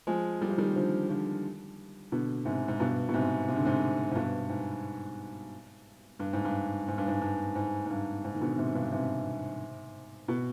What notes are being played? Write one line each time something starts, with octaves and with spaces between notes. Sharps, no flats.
F3 G#3
G3
F3
D#3 G3
D3 F3
D3 F3
B2 D3
G#2 C3
G#2
G2 B2
B2
G#2 C3
C3
D3
G#2 C3
G#2
G2 B2
G#2
G2
G#2
G2
G#2
G2
G#2
G2
G#2
G#2
G2
G#2
D#3
B2 D3
G#2 C3
G2 B2
G#2 C3
B2